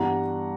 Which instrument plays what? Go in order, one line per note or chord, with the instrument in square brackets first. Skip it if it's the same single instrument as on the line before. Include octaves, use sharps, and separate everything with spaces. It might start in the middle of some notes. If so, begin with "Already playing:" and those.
Already playing: [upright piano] G2 E3 G3 B3 F#5 A#5